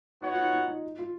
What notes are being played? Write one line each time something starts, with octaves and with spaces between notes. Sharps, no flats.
B3 D#4 F#4 C#5 F#5
F4
D#4
D#4
D#4
F4